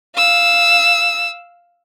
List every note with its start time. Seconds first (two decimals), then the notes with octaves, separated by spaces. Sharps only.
0.16 F5 E6